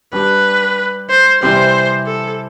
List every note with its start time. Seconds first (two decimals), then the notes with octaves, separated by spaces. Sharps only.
0.13 G3 D4 G4 B4
1.09 C5
1.42 C3 E3 G3 C4 G4 C5
2.06 A4